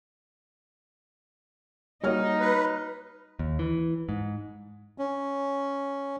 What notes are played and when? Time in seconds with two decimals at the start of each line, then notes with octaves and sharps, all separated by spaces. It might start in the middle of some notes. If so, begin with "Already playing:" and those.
2.04 G3 A#3 D#4 F#4 C#5 F6
2.40 B4
3.39 D#2
3.59 E3
4.09 G#2
4.98 C#4